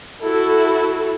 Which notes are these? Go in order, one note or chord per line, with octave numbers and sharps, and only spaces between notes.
E4 F#4 A4